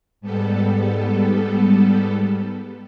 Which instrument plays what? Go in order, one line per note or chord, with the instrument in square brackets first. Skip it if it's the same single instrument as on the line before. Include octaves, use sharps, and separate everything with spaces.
[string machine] G#2 G3 B3 A4